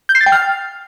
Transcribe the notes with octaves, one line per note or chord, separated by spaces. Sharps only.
G6
C7
A6
G5
F6